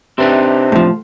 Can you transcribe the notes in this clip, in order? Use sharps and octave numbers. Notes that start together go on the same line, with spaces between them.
C3 C4 D4 D#4 G4 B4 E5
A2 F3